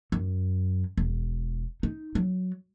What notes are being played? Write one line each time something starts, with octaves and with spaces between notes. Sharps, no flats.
F#2
E1
D#4
F#3